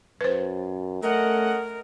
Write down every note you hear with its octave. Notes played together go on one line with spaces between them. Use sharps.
F#2 B4 C5
A3 C#4 A#4 D#5 F#5